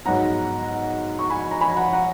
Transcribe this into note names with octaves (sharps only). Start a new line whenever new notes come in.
G#2 F#3 B3 F#5 A#5
C#6
G#5 B5
A#5
G#5 B5
F#5 A#5
F#5 A#5